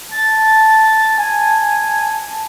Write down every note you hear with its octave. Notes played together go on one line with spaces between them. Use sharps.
A5 A6
G#5